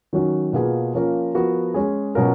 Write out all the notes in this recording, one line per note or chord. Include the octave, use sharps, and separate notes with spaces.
D#3 F#3 C#4 F#4
B2 A#3 F4 G#4 B4
F3 A#3 C#4 F4 A#4
F3 B3 F#4 A#4
G#3 C#4 G#4
B2 F#3 C#4 F4 A#4